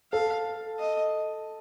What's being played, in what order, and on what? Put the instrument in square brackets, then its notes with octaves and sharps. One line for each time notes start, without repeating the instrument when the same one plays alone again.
[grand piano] A4 [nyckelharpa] F5
[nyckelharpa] D#5